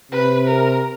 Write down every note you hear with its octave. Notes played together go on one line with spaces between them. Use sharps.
C3 B4
A#4